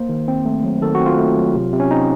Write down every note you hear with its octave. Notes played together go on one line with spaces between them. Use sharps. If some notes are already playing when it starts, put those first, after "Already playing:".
Already playing: A#3 C5
D#3
C4
A3
F#3
D#3 A4
F#4
C4
F4
A3
F#3
C3
C3
C#4
C4 D#4